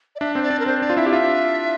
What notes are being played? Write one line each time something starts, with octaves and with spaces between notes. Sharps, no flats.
D5
D4 E5
C4 C5
D5
D4
A#4
C4 C5
D4 D5
F4
C4 E4 E5
G4 F5
D4 F4 E5